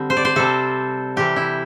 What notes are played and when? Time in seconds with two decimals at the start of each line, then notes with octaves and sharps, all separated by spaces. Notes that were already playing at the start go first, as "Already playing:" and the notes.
Already playing: D3 G3 C4
0.10 C5
0.17 D5
0.25 C5
0.36 C3 G3 C4 A4
1.16 C3 E3 G3 C4 G4
1.36 E4